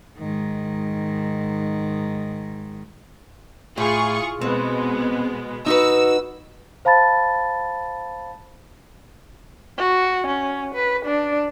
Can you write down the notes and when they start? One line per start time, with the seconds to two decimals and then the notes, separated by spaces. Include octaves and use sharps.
0.18 G#2 D#3
3.78 A2 F4 G#4 C#6
4.41 B2 G#3 B3 C4
5.66 D#4 F#4 B4 E6
6.85 C5 F5 A5 B5 A6
9.78 F#4
10.27 C#4
10.75 B4
11.06 D4